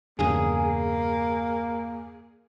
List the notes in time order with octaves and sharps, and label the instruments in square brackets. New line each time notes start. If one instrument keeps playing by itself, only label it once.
[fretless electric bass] E2 G2 C#3 [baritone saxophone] A#3 [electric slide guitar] G#4